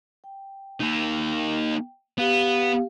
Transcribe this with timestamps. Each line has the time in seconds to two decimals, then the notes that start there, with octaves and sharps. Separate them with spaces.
0.24 G5
0.80 A#3 D#4
2.18 B3 G4 F5